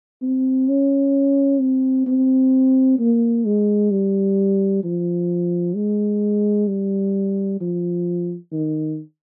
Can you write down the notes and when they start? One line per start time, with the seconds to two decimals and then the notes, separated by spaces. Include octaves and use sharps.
0.22 C4
0.69 C#4
1.60 C4
2.07 C4
2.99 A#3
3.45 G#3
3.91 G3
4.84 F3
5.75 G#3
6.68 G3
7.61 F3
8.52 D#3